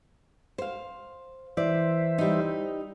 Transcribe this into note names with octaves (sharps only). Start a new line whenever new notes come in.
C5 F5
E3 C5 D5 E5
G3 D#4